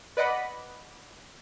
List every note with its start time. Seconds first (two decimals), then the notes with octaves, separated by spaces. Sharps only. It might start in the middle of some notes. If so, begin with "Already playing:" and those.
0.17 B4 D5 D#5 F#5 B5